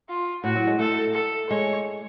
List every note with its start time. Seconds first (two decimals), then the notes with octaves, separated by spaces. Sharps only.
0.09 F4
0.43 A2 F#4
0.56 F#3
0.67 G#3
0.79 A3 A4
1.14 A4
1.50 G#3 C#5